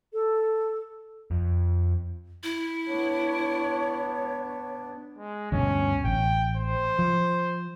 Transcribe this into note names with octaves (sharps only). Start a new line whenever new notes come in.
A4
F2
E4
B3 D4 C#5
G#3
D2 G2 B2 C#4
A1 G5
C5
F3